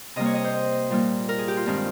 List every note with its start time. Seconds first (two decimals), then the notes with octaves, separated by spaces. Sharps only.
0.16 C3 G3 A#3 D#5
0.26 C#5
0.35 D#5
0.44 C5
0.90 A#2 G3 A#3
1.29 A#4
1.38 G#4
1.48 G4
1.57 F4
1.66 G2 D#3 G#3 C4